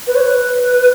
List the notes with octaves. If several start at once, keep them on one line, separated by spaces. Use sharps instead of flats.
B4
C#5
B4